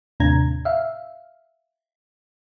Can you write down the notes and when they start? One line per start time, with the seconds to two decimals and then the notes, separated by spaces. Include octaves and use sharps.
0.20 D#2 A2 C3 D4 A#5 G#6
0.65 E5 F5